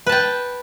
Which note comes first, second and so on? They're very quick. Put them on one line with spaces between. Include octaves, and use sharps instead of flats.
B4 A5 G5